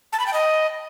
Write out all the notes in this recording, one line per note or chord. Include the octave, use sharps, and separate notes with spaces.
A5
B5
G5
D#5